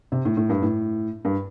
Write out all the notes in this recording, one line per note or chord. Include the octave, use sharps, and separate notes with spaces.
C3
A2
A2
G2
A2
G2